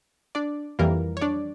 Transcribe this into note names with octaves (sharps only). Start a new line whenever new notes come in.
D4 D5
F2 E3 G3 A#3 A#4
C#5
D4 D5